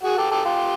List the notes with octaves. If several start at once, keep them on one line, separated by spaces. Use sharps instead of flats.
F#4 G#4
G4 A4
G4 A4
F4 G4